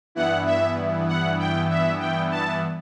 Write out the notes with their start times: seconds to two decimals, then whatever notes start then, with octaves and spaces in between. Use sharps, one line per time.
0.15 G2 E3 B3 E4 F#5
0.46 E5
1.08 F#5
1.39 G5
1.70 E5
2.00 G5
2.31 A5